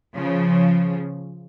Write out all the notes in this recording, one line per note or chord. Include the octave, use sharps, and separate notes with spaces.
C#3 F3